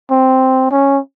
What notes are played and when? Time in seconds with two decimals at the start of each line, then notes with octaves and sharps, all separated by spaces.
0.11 C4
0.71 C#4